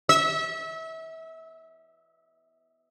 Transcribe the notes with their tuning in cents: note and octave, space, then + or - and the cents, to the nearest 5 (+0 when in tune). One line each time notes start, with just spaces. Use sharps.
E5 -30